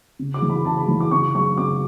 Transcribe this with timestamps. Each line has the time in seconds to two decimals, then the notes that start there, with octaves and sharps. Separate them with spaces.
0.19 C#3
0.34 D6
0.42 E3
0.49 B5
0.65 C#3 A5
0.77 B5
0.88 E3
1.00 D6
1.11 C#3 C#6
1.34 F#3 C#6
1.58 C#3 D6